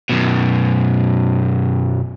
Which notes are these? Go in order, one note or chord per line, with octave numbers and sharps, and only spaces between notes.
F#2 B2